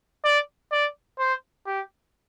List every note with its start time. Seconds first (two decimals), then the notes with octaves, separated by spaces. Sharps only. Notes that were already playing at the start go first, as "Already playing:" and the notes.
0.24 D5
0.72 D5
1.19 C5
1.67 G4